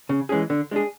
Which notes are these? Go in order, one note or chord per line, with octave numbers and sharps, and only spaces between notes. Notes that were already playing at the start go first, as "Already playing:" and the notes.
C#3
E3 G#3 C#4 G#4
D3
G#3 D4 G#4